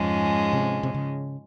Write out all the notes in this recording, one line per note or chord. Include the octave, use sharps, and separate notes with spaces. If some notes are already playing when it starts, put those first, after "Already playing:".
Already playing: F2 G#2 F3 G#3 C#4
C3
C3
C#3